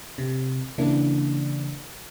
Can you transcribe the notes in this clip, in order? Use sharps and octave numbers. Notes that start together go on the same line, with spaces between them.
C3
C#3 E3 A#3 D4